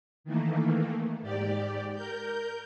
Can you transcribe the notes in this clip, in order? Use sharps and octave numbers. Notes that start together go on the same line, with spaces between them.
D#3 E3 A3 A#3
G#2 G4 D5
A#4 G6